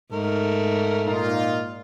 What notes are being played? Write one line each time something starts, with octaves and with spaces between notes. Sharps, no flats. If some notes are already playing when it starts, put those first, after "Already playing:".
G#2 A3 A#4
A#2 D#4 F4